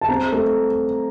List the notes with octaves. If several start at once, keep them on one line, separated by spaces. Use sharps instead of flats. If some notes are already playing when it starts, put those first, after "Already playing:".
A5
C4 A#5
A3